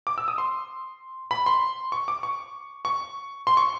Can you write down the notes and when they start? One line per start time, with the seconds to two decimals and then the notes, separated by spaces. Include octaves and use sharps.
0.07 D6
0.18 E6
0.28 D#6
0.38 C6
1.31 B5
1.46 C6
1.92 C#6
2.08 D6
2.23 C#6
2.85 C#6
3.47 C6
3.57 C#6